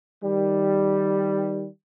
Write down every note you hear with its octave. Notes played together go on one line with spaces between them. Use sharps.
D#3 G3